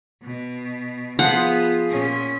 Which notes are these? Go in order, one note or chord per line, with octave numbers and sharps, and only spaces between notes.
B2
F3 B3 F4 G#4 F#5
A#2 C#4